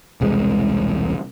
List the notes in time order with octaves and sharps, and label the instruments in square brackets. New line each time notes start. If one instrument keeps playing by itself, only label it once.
[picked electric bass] E1 C2 G#3